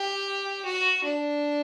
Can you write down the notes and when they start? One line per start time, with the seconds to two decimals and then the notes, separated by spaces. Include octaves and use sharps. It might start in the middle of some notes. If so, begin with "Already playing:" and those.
Already playing: G4
0.65 F#4
1.03 D4